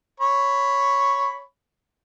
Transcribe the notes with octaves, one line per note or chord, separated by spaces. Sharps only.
C#5 B5 C#6